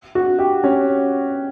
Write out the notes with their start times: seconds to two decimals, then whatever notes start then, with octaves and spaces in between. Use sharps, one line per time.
0.15 F#4
0.39 G4
0.64 C#4